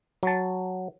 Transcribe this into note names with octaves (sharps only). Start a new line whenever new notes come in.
F#3 A5